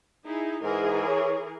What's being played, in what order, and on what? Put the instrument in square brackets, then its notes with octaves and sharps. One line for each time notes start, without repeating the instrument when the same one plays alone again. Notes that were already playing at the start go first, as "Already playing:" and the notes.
[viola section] D#4 E4 G#4
[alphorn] G#2 [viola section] E3 G#4 A#4
[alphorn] C#5